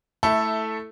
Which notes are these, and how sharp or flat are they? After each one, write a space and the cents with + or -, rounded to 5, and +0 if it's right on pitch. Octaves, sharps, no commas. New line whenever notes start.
A3 +0 E4 -10 A4 +0